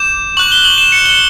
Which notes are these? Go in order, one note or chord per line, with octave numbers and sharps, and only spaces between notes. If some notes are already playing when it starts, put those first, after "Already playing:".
Already playing: D6 G6 E7
C#6 F#6 F#7
G7
F#7
E7
C#7
G7